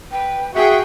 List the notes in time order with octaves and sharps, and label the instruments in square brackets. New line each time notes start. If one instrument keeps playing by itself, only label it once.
[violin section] B4 [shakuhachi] G5
[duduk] F#4 [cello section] G#4 [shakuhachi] E5 [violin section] F#5 G5